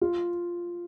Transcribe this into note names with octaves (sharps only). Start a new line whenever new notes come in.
F4